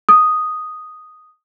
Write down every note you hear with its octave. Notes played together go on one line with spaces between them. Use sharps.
D#6